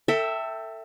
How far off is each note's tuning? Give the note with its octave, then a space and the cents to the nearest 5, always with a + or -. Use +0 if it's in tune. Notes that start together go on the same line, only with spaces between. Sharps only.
A4 +30 E5 +0 G5 +0